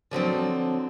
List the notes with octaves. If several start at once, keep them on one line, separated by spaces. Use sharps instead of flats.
D3 F3 F#3 C4